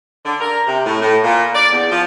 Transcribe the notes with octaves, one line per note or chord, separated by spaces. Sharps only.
D3
A#4
C3
A2
A2
A#2
D5
E2
F3